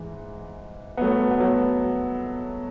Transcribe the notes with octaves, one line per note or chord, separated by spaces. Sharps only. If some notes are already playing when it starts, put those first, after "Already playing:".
Already playing: G#2 E3
B3
F#3 A3
B3
F#3 A3